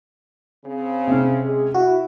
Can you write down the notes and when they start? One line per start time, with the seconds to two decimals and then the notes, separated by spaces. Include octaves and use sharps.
0.65 C#3 C4
1.07 C3 C#4
1.42 G#3 G#4
1.74 E4 F#4